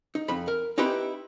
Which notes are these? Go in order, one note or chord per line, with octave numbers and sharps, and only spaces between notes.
D#4
F2 B5
A#4
C4 D#4 E4 G4 B4 G5